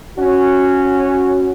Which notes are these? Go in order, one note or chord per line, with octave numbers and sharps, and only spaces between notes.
C#4 F#4